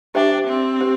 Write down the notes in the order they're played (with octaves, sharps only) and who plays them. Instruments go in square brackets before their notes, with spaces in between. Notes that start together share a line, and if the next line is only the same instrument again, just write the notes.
[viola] D4 [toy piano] G4 C5 E5 G5
[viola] C4
[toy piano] G4 C5